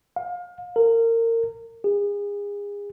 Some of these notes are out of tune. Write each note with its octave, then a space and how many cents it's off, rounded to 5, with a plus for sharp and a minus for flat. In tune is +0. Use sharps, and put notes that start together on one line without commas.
F5 +30
A#4 -25
G#4 -30